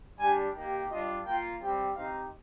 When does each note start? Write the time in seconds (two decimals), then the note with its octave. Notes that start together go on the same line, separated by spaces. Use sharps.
0.18 G3 D4 G4 G#5
0.54 A#3 D#4 G4
0.89 G3 D4 F4 D#5
1.25 A#3 F4 G5
1.60 G3 C4 G4 G5
1.95 C4 D#4 G4 F5